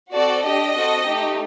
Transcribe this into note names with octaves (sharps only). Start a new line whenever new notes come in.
C4 F#4 A4 D5
D4 G4 D#5
C4 F#4 A4
A3 D#4 G4